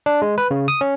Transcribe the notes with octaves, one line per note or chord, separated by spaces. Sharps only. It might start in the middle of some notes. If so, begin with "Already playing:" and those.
D4
G#3
B4
C#3
D#6
C#4